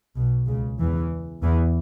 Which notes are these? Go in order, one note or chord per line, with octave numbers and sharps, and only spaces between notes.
B1 B2
C#2 C#3
E2 E3
E2 E3